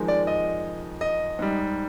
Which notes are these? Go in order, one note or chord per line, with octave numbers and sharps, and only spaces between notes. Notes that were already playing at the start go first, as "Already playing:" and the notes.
Already playing: F2 D#3 G#3
D5
D#5
D#5
G#2 G3